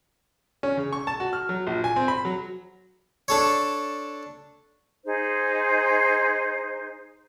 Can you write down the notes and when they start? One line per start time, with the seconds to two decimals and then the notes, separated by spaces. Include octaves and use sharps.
0.63 C#4
0.77 C#3
0.93 C#6
1.07 A5
1.20 F#4
1.33 F6
1.49 F#3
1.67 A#1
1.84 G#5
1.96 C4
2.08 B5
2.25 F#3
3.28 D4 A4 C#5
5.05 D#4 G#4 C5